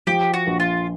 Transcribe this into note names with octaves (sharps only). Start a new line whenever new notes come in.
F3 G4
F#4
A#1
F4